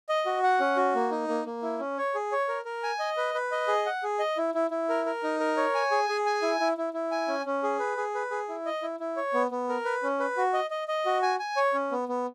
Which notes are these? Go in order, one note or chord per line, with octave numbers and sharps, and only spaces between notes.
D#5
F#4
F#5
C#4
F#4
A#3
D#4
A#3
A#3
E4
C#4
C#5
G#4
C#5
A#4
A#4
G#5
D#5
B4
B4
D#5
G#4
F#5
G#4
D#5
E4
E4
E4
A#4
A#4
D#4
A#4
C#5
G#5
G#4
G#4
G#5
E4
E4
E4
E4
G#5
C#4
C#4
G#4
B4
G#4
B4
G#4
E4
D#5
E4
E4
C#5
B3
B3
A#4
B4
C#4
B4
F#4
D#5
D#5
D#5
F#4
G#5
G#5
C#5
C#4
B3
B3